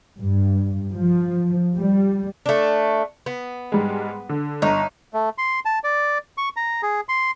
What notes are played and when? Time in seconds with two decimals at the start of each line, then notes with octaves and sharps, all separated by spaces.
0.17 G2
0.95 F3
1.76 G3
2.46 A3 D4
3.26 B3
3.72 G#2 G3 G#3
4.29 D3
4.62 G1 D#4 A#5
5.13 A3
5.38 C6
5.65 A5
5.84 D5
6.38 C#6
6.56 A#5
6.83 G#4
7.09 C6